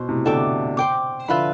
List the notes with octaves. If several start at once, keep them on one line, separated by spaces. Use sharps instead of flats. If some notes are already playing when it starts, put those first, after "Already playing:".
Already playing: B2 C5
A2 C3
B2 D3 A4 E5 G5 D6
C5 G5 D6
D3 F3 F4 B4 E5 B5